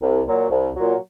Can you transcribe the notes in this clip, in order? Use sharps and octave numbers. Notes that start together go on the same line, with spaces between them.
C2
A#2 F#3
C2
A#2 F#3